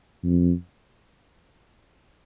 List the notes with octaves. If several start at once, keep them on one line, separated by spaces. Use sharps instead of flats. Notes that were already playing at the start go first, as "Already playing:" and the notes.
F2